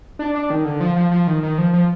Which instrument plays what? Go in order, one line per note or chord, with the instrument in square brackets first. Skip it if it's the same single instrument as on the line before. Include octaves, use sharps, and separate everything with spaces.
[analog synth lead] D4
D4
D#3
D3
F3
F3
F3
D#3
D#3
F3
F3